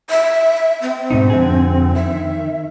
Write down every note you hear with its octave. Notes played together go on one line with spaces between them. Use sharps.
E5
C4
G#2 B2 D#4
F2 D3 G#4
D#3 E5